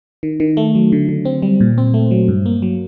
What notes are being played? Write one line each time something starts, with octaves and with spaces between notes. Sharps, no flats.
D#3
D#3
A3
F#3
D3
D3
C4
G3
A#2
C4
A3
F#3
G2
A#3
F#3